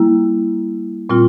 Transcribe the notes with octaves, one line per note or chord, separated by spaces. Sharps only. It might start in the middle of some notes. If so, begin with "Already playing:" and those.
Already playing: G3 A#3 E4
A#2 G3 C4 F4